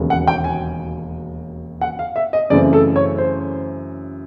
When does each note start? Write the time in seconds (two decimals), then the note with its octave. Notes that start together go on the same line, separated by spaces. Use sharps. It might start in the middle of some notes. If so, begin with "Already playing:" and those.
Already playing: E1 D#2 C#3 F#3 B3
0.10 F#5
0.28 G5
0.44 G#5
1.81 F#5
1.99 F5
2.16 E5
2.33 D#5
2.50 F#2 C#3 E3 A3 C4 D5
2.73 A4
2.96 C#5
3.18 C5